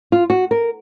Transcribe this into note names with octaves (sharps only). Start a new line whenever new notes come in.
F4
F#4
A#4